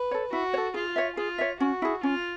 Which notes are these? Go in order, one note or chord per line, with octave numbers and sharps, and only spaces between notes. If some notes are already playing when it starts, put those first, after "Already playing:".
Already playing: B4
A4 C#5
E4 F#4
C#5
A4
F4 G#4
C#5 E5
F4 G#4
C#5 E5
C#4 F#4
E4 G#4
C#4 F4